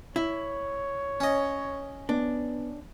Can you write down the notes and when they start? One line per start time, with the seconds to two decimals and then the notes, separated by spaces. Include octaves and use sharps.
0.16 E4 C#5
1.20 C#4 D#5
2.09 B3 D4